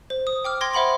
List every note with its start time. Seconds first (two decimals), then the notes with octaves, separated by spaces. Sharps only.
0.10 C5
0.27 D#6
0.45 G5 D6 F6
0.61 G5 C6 G#6 A#6
0.74 C5 E5 F#5 B5 C6